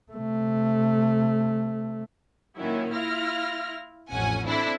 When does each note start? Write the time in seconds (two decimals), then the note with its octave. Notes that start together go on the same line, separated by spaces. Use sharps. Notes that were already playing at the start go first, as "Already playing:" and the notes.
0.12 C3 A3
2.58 A#2 D#3 F#3 C#4 E4
2.91 E4 F4 F6 A#6
4.11 A1 F2 C#4 F#5 G#5
4.45 C4 D4 E4 A4 E5